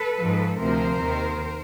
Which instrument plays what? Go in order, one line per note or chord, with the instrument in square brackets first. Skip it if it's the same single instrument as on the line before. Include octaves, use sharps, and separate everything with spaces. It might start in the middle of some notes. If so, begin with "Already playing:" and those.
Already playing: [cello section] A4 B4
G#2 F3
D2 C3 F3 A#4 C5
D#2 D#3